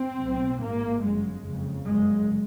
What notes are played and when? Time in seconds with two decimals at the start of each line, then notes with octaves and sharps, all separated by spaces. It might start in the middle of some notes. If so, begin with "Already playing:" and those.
Already playing: C4
0.20 B1 A2
0.61 A1 G#2 A#3
1.02 G1 F#2 C#3 G#3
1.44 F#1 F2 C#3
1.85 G1 F#2 C#3 G#3